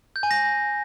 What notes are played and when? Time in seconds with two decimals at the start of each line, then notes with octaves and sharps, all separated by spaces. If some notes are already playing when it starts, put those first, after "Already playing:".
0.16 G6
0.23 G#5
0.31 A#6